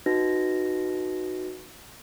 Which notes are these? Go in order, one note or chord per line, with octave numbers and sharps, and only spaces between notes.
D#4 F#4 B4 A#6